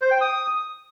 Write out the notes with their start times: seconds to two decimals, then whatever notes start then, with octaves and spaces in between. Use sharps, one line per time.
0.02 C5
0.11 G5
0.21 D#6